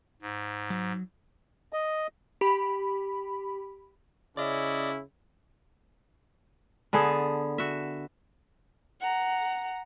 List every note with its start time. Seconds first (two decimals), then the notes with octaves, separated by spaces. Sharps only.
0.22 G#2
0.70 F#3
1.73 D#5
2.41 G4 B5
4.37 C#3 C#4 E4 D5 D#5
6.93 D3 B3 G#4 A4
7.58 F#4 E5
9.01 F#5 A#5